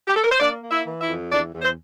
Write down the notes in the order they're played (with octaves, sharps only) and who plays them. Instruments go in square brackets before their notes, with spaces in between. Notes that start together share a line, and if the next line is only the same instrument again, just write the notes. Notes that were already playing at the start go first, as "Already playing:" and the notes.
[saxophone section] G4
A4
A#4
C5
A#3 D4 D5
A#3
E4 E5
E3
E4 E5
F2
E2 D4 D5
E2
C5